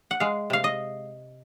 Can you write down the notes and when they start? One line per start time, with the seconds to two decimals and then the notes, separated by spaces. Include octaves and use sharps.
0.11 F#5
0.20 G#3 F5
0.50 C3 F5
0.64 D#5